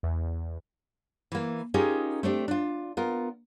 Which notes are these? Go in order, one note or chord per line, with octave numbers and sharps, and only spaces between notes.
E2
E3 A#3
C#4 D#4 F4 G4 G#4 A#4
A3 C4 D4 G4
D4 F4
B3 F4 A#4